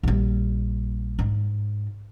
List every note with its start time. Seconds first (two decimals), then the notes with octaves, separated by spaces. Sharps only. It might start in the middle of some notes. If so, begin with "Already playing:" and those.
0.03 A#1 G3
1.19 G#2